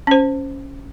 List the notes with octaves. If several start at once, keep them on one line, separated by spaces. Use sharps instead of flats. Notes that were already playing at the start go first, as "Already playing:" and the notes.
C#4 C5